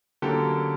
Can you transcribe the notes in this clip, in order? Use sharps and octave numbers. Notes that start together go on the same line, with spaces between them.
D3 F#3 A#3 C#4 G4 A4